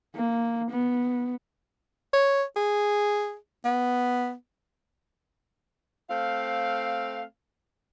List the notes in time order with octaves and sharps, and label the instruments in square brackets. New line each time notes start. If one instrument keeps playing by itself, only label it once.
[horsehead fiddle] A#3
B3
[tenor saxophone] C#5
G#4
B3
[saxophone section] A3 C4 F5